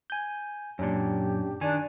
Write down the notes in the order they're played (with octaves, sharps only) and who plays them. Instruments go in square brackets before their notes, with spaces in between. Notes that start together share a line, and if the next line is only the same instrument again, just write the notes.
[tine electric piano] G#5 G6
[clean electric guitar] F#2 A#2 [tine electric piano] C#4 D4 [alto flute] G4
[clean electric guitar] D#3 [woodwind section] D4 [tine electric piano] G#5